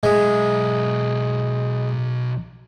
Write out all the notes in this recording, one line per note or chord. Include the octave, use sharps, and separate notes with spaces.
B1 G#3 E5